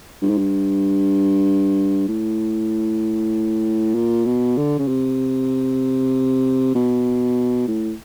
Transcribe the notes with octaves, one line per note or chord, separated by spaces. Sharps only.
G2
G#2
G2
A2
A#2
B2
D3
C#3
C3
B2
A2